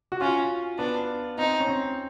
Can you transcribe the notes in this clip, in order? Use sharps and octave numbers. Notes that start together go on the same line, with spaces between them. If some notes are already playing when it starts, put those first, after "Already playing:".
F#4
C#4 F4
B3 D4
C4 D#4
C#4
C4